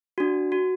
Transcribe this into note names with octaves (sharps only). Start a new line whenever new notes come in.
D4 F#4
F#4